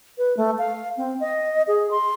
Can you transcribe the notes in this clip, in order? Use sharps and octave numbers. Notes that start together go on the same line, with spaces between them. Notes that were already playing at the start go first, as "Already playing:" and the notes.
B4
A3
F5
C4
D#5
G#4
C6